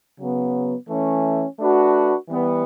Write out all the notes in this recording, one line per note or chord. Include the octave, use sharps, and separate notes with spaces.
C#3 F#3 B3
E3 A3 C#4
A3 D4 F#4 B4
E3 G3 B3